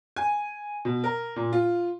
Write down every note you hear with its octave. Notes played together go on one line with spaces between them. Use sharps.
G#5
B2
A#4
A#2
F4